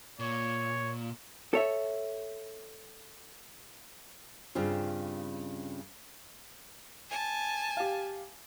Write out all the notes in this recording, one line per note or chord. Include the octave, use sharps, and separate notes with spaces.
A#2 C#5
A4 C#5 E5
G2 C#3 C4 F4
G#5 A5
G4 F5